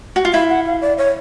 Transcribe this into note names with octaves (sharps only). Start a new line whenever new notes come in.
F#4
F4
E4 F5
F#5
F5
D5
C#5